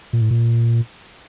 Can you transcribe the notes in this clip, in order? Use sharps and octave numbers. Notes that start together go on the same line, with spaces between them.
A#2
A2
A#2